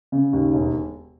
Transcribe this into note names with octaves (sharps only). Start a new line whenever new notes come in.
C#3
D#2
E1